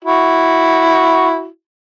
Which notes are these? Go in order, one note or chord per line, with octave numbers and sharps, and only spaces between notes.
E4 F#4